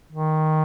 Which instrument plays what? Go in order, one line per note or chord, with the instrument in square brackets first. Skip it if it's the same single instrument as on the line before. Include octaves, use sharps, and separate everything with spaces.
[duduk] D#3